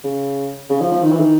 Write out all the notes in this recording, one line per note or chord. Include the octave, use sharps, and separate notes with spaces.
C#3
C#3
F3
F3
D#3
E3
D#3